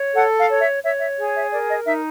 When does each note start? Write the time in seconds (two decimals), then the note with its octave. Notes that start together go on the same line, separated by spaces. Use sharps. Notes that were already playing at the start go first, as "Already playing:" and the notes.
Already playing: C#5
0.15 A4 F#5
0.38 F5
0.49 C#5
0.61 E5
0.83 C#5 E5
1.00 E5
1.18 G#4
1.35 E5
1.52 A#4 D5
1.69 D#5
1.86 D#4 E5